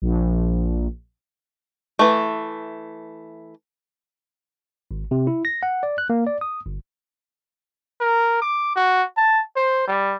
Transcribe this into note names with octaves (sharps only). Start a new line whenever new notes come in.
A#1
E3 A3
G#1
C3
E4
A#6
F#5
D5
F#6
A#3
D5
D#6
G1
A#4
D6
F#4
A5
C5
G3